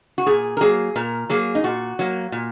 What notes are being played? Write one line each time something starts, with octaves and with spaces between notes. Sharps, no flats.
F#4
A#2 G#4
A#4
F#3 A#3 G#4
A#2 A#4
F#3 A#3 G#4
D#4
A#2 F#4
F#3 A#3
A#2